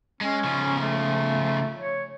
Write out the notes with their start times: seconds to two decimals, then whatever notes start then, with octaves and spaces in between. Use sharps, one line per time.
0.21 G#3 C#4
0.44 C#3 F3
0.79 A3
1.78 C#5